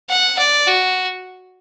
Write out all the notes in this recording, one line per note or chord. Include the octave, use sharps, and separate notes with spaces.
F#5
D5
F#4